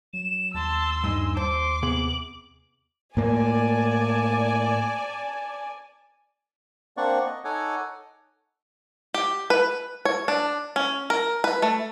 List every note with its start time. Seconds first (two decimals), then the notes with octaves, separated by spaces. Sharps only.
0.13 F#3 E7
0.54 D#2 A5 C6 E6
1.04 G2 D#4 G#5
1.37 C5 A5 C6 D6
1.83 C3 B3 G#4 F#7
3.17 A2 A#3 D5 G#5 A5
6.97 A#3 C4 D4 D5 F#5 C#6
7.26 D#5
7.44 D#4 A4 C#5 F#5 G#5 D6
9.14 G4
9.50 B4
10.05 C#5
10.28 D4
10.76 C#4
11.10 A#4
11.44 B4
11.62 A3